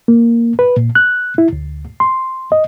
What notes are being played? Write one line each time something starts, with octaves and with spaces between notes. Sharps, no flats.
A#3
B4
A#2
F#6
E4
D2
C6
D#5